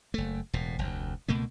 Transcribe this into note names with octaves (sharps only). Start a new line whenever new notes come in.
F#1 A3
E1 A2
F1 D2
C#2 B2 A3 A#3